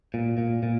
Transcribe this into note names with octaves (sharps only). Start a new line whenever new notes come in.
A#2
A#2
A#2